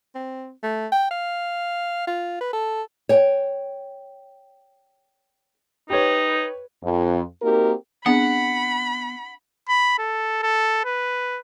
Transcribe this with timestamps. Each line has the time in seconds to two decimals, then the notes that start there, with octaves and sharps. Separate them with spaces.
0.15 C4
0.63 A3
0.92 G5
1.11 F5
2.07 F4
2.41 B4
2.53 A4
3.09 C#5 G5
5.90 D#4 G4 B4 C#5
6.83 F2
7.42 A#3 C4 D#4 F#4 G4 A#4
8.06 B3 C4 D4 G#4 F#5 B5
9.68 B5
9.98 A4
10.43 A4
10.85 B4